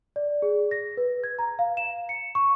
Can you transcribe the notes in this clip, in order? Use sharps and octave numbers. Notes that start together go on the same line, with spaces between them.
D5
G#4
A#6
B4
G#6
A#5
F5
E7
C#7
C#6